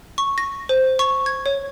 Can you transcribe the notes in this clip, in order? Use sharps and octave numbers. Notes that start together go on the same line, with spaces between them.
C#6
A#6
C5
C#6
G#6
C#5